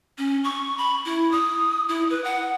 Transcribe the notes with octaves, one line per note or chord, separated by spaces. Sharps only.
C#4
C#6
B5
E4
D#6
E4
B4
F#5